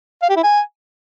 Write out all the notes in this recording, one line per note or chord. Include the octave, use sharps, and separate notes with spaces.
F5
G4
E4
G#5